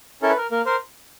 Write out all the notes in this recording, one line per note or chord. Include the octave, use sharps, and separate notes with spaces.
C#4 E4 A4 A#4
B4
A#4
A#3 A#4
A#4 C5